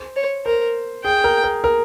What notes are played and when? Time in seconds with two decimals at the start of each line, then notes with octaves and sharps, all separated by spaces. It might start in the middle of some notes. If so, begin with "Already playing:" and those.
Already playing: C5
0.16 C#5
0.46 A#4 C5
1.04 G#4 G5
1.24 A#4
1.44 A#4
1.64 A#4